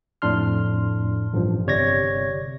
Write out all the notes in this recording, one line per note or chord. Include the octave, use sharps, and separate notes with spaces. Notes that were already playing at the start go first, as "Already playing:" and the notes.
F2 A2 D4 C6 F6
A1 G2 F3
G1 C3 C#5 D5 G#6 A#6